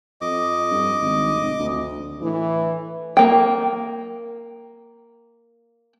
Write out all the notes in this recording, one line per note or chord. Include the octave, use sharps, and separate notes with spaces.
F2 D#5 D6
G2
G#1
F1
D2
A2 E3
A#3 G5